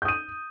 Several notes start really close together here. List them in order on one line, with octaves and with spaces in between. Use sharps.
G6 D#6 D#7